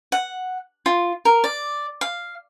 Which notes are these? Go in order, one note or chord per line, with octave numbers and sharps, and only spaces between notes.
F#5
F4
A#4
D5
F5